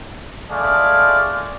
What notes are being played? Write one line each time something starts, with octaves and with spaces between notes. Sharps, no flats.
G#3 A3 G#4 D5 F5